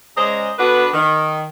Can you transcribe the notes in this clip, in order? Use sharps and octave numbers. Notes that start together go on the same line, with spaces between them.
C#3 G#3 G#4 C5 D5 A#5
D3 B3 D4 F#4 B4
D#3